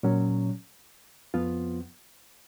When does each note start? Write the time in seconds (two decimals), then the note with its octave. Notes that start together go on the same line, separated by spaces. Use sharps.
0.03 A#2 F#3 C#4
1.34 F2 F3 B3 F4